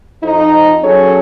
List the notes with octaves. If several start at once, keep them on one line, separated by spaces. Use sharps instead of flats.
F2 D#4
F#3 C#4 G#4 A4 C#5